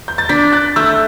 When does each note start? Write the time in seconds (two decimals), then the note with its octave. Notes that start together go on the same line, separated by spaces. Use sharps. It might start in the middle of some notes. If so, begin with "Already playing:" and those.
0.08 G6
0.18 A6
0.29 D4 G6 B6
0.52 F#6 A6
0.76 A3 E6 G6